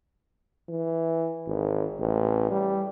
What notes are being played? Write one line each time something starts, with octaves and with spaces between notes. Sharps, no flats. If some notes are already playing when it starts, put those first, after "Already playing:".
E3
G#1
A1
G3